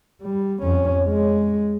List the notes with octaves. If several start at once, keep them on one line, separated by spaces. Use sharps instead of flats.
G3
F2 C#4
G#3